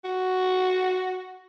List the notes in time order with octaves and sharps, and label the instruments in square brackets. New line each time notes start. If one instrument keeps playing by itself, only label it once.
[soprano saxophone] F#4